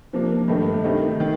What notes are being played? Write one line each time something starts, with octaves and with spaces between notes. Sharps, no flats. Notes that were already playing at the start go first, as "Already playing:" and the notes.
C3 F3 A#3 D4
G2 D#3 A3 D#4
C3 D#3 A3 D#4
D#3